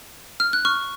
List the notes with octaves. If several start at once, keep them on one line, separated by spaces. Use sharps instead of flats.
F6
F#6
C#6 F6